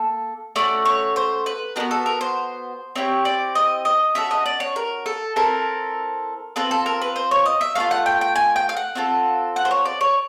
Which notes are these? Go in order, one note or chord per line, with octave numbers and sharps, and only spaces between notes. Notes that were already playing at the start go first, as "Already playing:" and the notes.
Already playing: A#3 A4
A3 C#4 F#4 D5
C#5
C5
B4
B3 D4 F#4 A#4
A4
A#4
C5
C4 E4 G4 C#5
D5
D#5
D#5
C#4 F#4 A4 E5
D#5
D5
C#5
A#4
A4
C4 E4 A4 A#4
C4 F4 A4 B4
A4
A#4
B4
C5
C#5
D#5
E5
A3 D4 F4 F5
F#5
G5
G5
G#5
G5
F5
F#5
C4 F4 A4
F#5
C5
C#5
D5
C#5